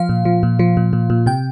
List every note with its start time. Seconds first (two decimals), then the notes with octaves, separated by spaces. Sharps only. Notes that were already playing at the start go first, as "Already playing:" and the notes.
Already playing: F3 F5
0.09 A#2
0.25 F3
0.43 A#2
0.59 F3
0.77 A#2
0.93 A#2
1.10 A#2
1.26 C3 G5